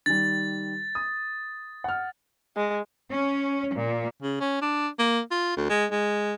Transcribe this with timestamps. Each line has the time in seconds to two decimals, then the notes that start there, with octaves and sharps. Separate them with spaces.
0.06 D#3 G3 A6
0.95 D#6
1.84 F#5 F6
2.56 G#3
3.10 C#4
3.74 A#2
4.22 C#3
4.40 C#4
4.62 D4
4.99 A#3
5.31 F4
5.57 D2
5.69 G#3
5.91 G#3